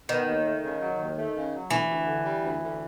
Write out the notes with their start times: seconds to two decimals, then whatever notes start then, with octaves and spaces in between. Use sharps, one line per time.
0.09 D#3 B3
0.27 D#2
0.44 A3
0.62 C#3
0.81 F#3
0.99 D#2
1.16 A3
1.35 C#3
1.53 F#3
1.70 D2 E3
1.89 D2
2.06 D3
2.24 G3
2.42 D2
2.60 D2